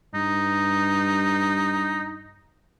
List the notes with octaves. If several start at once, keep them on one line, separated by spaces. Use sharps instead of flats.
G2 D#4